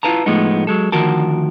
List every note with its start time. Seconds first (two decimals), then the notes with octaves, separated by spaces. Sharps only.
0.03 E4 F4 B4 A5 A#5
0.26 A2 F3 G#3 A3 B3 D#4
0.67 F#3 G#3 A4
0.92 D2 D#3 F3 F#4 A#4 A5